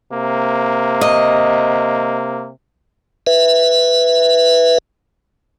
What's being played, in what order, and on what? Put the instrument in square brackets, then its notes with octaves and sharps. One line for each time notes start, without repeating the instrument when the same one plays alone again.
[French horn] C3 [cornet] A#3
[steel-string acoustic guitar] D#5
[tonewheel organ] B4 E5